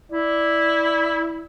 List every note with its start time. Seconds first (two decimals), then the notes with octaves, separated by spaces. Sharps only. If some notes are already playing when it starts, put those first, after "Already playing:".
0.12 E4 D5